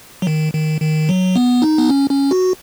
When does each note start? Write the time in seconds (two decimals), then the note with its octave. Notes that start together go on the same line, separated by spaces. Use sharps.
0.22 F#3
0.27 D#3
0.54 D#3
0.82 D#3
1.09 F#3
1.36 B3
1.62 D#4
1.78 B3
1.90 C#4
2.10 C#4
2.31 F#4